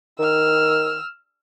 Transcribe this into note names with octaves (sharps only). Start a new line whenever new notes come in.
D#3 E6 F6